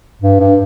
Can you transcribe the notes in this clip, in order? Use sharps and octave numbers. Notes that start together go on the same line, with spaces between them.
G2
G2